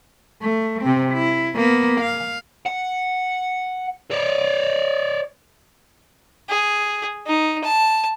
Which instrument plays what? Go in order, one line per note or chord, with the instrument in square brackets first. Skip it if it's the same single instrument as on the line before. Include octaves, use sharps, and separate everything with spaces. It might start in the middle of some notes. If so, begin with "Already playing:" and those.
[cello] A3
C3 C4
E4
A#3 B3
F5
[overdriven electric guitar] F#5
C#5 D5
[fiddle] G#4
D#4
A5